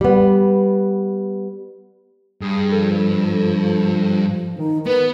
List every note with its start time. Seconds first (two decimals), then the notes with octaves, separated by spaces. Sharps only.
0.01 G3 B3
2.41 G2 G#4
2.72 F3 A4
4.58 D#3 D#4
4.86 B3 B4